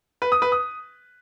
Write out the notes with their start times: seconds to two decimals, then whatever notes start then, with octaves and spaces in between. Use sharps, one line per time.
0.22 B4
0.32 D#6
0.42 B4
0.52 D#6